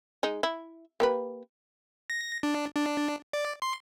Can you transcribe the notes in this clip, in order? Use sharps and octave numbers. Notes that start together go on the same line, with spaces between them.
G#3 D#4
E4
A#3 G4 B4
A#6
D4
D4
D5
C6